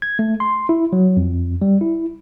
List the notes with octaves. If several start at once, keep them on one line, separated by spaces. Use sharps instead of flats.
G#6
A3
C6
E4
F#3
F2
G3
E4